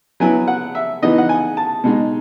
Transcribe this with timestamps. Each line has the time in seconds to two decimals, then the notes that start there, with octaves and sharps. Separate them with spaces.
0.20 F#3 B3 E4 G#5
0.48 F#5
0.75 E5
1.02 E3 B3 D#4 D#5
1.18 F#5
1.29 G#5
1.57 A5
1.84 B2 G#3 D#4